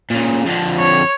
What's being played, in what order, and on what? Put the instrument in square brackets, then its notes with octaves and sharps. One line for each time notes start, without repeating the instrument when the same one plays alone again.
[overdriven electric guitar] A#2 C#3
F2 D3
[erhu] C#5